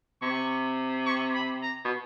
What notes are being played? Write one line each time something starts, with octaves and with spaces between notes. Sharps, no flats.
C3 C#6
C#6
B5
A#5
B2